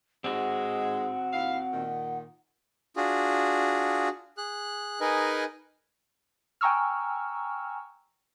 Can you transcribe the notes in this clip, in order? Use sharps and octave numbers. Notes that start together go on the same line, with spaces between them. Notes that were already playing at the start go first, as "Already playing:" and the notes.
G#2 G#3 C4 F#4 F#5
D#2 E4 F5
A#2 D#3
D4 F4 F#4 G#4
G#4 F#6
D#4 G#4 A#4 B4 D#5 G#5
G5 G#5 A#5 C#6 E6 F6